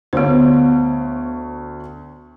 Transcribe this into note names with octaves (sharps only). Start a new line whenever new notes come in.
D2 B3 C5 C#5